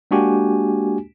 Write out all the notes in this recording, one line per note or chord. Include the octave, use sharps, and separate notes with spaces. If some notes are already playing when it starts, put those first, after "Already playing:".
G#3 A#3 D4 F#4 G4 G#5